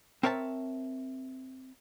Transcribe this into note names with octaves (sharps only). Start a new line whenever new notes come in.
C4 A#4 C#5 E5 A5